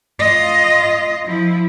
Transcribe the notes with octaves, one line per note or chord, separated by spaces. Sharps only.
F4 D#5
F3 E4